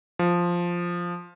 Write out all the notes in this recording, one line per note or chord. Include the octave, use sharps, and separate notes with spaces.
F3